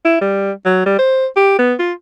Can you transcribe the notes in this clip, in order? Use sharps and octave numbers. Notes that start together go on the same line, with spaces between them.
E4
G3
F#3
G3
C5
G4
B3
F4